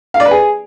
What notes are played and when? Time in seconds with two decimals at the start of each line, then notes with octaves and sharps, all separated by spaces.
0.14 F5
0.20 D5
0.25 B4
0.31 G#4